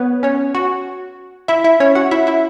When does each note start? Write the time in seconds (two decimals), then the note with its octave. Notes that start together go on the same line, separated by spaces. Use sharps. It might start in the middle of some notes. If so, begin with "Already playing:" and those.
Already playing: B3 B4 C#5
0.23 C#4 C#5
0.55 F#4 F#5
1.48 E4 E5
1.64 E4 E5
1.80 C#4 C#5
1.95 F#4 F#5
2.11 E4 E5
2.27 E4 E5